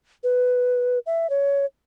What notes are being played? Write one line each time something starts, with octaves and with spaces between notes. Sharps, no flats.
B4
E5
C#5